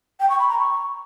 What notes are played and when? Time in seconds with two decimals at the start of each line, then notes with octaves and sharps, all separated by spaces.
0.20 G5
0.30 C#6
0.39 B5
0.49 A#5
0.59 C#6